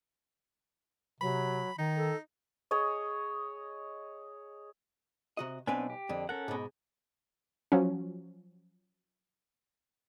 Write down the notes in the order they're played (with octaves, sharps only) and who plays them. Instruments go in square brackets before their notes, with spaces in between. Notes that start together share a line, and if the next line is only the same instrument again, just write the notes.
[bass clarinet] C3 [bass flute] F#3 [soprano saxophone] B5
[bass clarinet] D#3 [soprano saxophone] D#4
[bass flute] A4
[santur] G#4 C#5 D#5
[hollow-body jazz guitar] C3 F#4 D#5
[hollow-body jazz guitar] B1 B4 G#5 [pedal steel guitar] B3 C4 D4
[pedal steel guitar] G4
[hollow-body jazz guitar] F2 D3
[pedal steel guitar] C#4 A4 F#5 [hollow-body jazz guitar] A#4
[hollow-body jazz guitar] G#2 B2
[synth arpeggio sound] F3 F#3 C#4